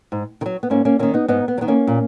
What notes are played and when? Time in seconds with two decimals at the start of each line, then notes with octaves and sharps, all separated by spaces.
0.12 G#2
0.41 D#3
0.46 F#3
0.63 B3
0.70 G#2 A#3 C#4
0.85 A#3 C#4
0.99 F#3 A#3 C#4
1.03 D#3
1.14 B3 D#4
1.28 G#2 B3 D#4
1.48 B3
1.58 F#3
1.61 D#3 B3
1.68 A#3 C#4
1.87 A#2